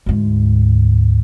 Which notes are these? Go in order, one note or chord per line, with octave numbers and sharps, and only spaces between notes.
D2 G#2